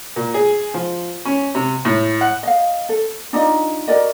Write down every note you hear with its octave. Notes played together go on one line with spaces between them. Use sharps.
A#2
G#4
F3
C#4
C3
A2
F#5
D#5 F5
A4
D4 D#4 F4 D#5
F#4 A#4 D5 D#5